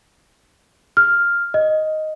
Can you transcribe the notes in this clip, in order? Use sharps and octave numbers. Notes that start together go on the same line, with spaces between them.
F6
D#5